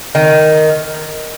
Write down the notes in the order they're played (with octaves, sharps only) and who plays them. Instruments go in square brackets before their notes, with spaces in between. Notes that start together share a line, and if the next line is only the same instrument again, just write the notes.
[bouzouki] D#3